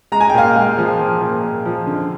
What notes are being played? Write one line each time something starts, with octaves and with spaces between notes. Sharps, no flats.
G#3 A#5
G#5
G5
A#2 F5 G#5
G#3
F3
F3
A#2
A#2
F3
D3